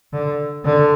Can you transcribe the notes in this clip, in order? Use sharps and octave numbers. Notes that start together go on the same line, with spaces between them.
D3
D3